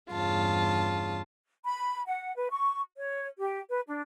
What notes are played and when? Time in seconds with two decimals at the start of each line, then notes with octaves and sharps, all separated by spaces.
0.11 E2 G2 C#3 F4 A5
1.65 B5
2.07 F#5
2.36 B4
2.51 C#6
2.97 C#5
3.39 G4
3.69 B4
3.87 D4